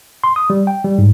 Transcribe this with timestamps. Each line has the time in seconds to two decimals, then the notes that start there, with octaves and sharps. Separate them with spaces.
0.24 C6
0.36 D#6
0.50 G3
0.67 G5
0.84 G3
0.98 G#2